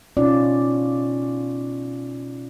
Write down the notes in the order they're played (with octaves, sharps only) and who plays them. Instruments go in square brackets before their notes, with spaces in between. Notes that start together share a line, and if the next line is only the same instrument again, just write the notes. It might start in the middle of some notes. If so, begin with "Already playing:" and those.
[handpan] B2 C#4 D#4 F4 D5